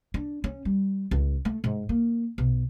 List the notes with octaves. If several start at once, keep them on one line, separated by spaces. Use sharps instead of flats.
D4
C#4
G3
C#2
A3
G#2
A#3
B1